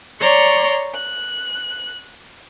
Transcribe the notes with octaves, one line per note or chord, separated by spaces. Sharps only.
C#5 D5 A#5 C6 C#6
F#6